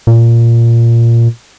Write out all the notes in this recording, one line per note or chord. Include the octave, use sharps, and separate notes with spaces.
A#2